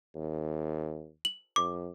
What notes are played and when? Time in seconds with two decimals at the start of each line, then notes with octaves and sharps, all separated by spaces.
0.15 D#2
1.25 F#7
1.56 F2 D6